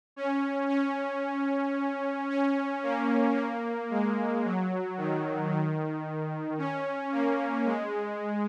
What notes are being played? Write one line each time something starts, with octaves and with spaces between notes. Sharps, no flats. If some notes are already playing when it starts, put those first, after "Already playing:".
C#4
C#4
C#4
A#3
A#3
G#3
F#3
D#3
D#3
C#4
A#3
G#3